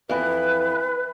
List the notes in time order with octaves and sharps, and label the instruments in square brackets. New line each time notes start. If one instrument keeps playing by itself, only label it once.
[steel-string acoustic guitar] F2 E3 [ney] B4